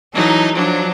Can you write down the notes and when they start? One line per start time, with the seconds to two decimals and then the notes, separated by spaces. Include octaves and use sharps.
0.14 E3 F#3 D#4 A4
0.53 F3 F#3 D4